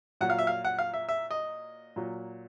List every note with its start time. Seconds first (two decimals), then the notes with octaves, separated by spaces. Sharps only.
0.21 A#2 F#3 F#5
0.30 F5
0.39 E5
0.47 F5
0.65 F#5
0.79 F5
0.94 E5
1.09 E5
1.31 D#5
1.96 A#2 F#3